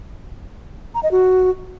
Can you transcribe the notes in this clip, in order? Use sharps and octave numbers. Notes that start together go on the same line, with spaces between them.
A#5
D#5
F#4